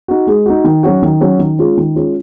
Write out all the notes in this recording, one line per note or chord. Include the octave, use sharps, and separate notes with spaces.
D#4 F#4
G#3
D#4 F#4
D#3
F#3 C#4 F#4
D#3
F#3 C#4 F#4
D#3
G#3 C#4 F4
D#3
G#3 C#4 F4